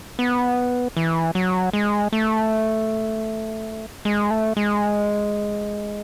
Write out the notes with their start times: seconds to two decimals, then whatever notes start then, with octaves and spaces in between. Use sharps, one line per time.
0.19 B3
0.97 E3
1.35 F#3
1.73 G#3
2.13 A3
4.05 G#3
4.30 A3
4.57 G#3